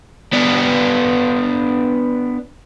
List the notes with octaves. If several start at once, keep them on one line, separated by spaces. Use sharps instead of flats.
B3 D4